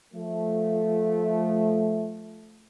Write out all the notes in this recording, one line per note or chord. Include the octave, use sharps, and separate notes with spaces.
F3 A3